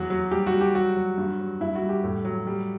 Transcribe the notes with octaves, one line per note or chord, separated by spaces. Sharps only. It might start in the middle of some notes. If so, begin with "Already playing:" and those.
Already playing: E2 F#3 F#4
F#3
G3 G4
F#4
G3
G4
F#3 F#4
F#3
G2
F#3
G2 E4
F#4
G3
G4
A2
F#3
G3